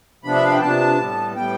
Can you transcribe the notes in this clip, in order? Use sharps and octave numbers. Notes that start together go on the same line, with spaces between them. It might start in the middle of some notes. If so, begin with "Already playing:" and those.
C3 F3 B3 D4 B5
E5
F5
G5
C3 F3 B3 D4 A5
A2 G3 B3
A2 G3 B3 G5